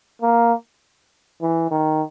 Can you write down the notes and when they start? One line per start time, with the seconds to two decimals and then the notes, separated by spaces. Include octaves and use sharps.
0.22 A#3
1.42 E3
1.71 D#3